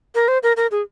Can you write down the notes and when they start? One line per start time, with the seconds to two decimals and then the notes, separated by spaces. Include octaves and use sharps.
0.15 A#4
0.28 C5
0.43 A#4
0.57 A#4
0.71 G#4